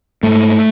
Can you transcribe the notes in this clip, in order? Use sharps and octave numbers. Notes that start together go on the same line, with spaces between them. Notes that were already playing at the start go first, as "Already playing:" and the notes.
G#2 A3